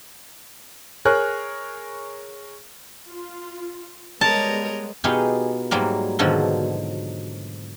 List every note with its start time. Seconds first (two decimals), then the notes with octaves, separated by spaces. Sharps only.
1.05 G#4 A#4 C#5 G#5 F6 F#6
3.08 F4
4.21 G3 G#3 B3 A#4 C#5 D#5 A5
5.04 B2 B3 D#4 F4 G4 G#4
5.71 G#2 F#3 G3 A#3
6.19 G#2 B2 D3 D#3 F3 F#3